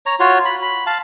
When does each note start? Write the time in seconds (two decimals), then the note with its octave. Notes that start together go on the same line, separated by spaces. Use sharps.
0.06 C#5 A#5
0.20 F4 F#4 C#5
0.45 B5
0.62 B5
0.87 F5 A5